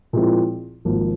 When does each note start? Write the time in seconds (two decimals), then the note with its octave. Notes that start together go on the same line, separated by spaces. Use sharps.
0.13 A#2 F3 G#3 C4 E4
0.85 G#1 G#2 F3 A#3